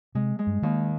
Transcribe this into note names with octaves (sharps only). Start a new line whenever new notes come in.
C3 G#3
G#3
G2
D#2 D#3